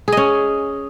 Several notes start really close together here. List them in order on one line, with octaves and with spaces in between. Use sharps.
G#4 D#5 C#4